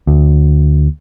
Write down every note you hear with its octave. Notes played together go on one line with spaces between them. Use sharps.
D2